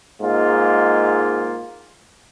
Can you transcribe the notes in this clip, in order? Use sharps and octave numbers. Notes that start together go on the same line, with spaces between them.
G#2 G#3 A#3 F4